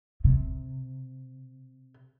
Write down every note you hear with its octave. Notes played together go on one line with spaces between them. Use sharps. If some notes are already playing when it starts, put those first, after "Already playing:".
C3